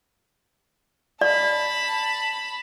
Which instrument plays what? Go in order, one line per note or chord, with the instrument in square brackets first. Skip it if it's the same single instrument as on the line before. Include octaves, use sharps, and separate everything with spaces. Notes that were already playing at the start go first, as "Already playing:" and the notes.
[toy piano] D5 [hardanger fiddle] A5 B5